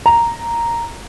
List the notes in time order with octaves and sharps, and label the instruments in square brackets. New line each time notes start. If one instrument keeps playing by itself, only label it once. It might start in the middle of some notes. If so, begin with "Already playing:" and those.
[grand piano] A#5